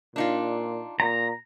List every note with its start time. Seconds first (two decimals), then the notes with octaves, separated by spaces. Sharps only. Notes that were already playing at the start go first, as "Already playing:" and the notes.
0.16 A#2 D4 D#4 F4
1.00 A#2 A#5